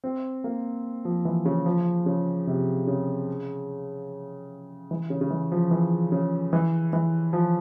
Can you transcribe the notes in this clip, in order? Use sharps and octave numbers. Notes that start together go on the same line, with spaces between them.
C4
A#3
F3
E3
C#3
F3
C#3
C3
C#3
E3
C#3
C#3
E3
F3
E3
C#3
E3
E3
F3